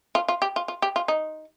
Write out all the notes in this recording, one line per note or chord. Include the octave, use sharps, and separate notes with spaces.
F4
F4
G4
F4
F4
G4
F4
D#4